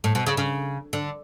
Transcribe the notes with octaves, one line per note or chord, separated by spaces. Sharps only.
A2
B2
C#3
C#3
D3